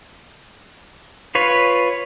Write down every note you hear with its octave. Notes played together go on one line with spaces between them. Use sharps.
F4 B4 C#5